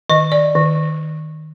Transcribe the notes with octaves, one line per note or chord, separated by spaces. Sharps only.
D#3 D#5
D5
D#3